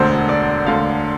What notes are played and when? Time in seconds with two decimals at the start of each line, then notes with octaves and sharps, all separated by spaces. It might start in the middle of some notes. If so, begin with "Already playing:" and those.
Already playing: E1 D2 D3 C5
0.29 D5
0.66 E1 D2 D3 F5